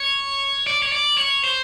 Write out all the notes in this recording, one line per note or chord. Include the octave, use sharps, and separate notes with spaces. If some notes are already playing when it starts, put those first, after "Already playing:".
Already playing: C#5
D5
C#5
D5
C#5
C5